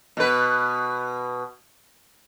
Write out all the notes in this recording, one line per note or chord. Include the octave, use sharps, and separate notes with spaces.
B2 B4